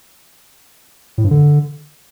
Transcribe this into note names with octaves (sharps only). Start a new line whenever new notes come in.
A2
G2
D3